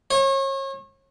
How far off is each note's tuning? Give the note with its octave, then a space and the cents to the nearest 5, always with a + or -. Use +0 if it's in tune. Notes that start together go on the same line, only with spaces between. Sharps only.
C#5 -35